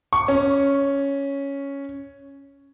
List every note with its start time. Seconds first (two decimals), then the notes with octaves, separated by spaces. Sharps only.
0.13 C#6
0.28 C#4